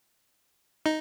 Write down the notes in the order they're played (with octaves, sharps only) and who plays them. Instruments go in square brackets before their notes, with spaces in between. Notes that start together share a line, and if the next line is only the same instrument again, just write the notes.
[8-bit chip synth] D#4